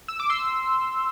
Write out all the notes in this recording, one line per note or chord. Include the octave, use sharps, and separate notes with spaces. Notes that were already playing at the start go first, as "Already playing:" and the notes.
E6
D6
C6 E6